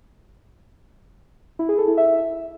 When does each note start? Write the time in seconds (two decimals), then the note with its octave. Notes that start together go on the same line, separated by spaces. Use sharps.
1.59 E4
1.69 G#4
1.78 A4
1.88 E4
1.97 E5